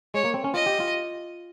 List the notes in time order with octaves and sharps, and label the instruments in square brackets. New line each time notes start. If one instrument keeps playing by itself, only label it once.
[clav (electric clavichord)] G#3 [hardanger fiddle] C#5
[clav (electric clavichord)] A#3
C4
C#4
[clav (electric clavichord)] F4 [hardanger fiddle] D#5
[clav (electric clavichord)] G4
F4